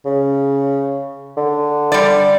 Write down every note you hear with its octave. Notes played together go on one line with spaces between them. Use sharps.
C#3
D3
G3 D5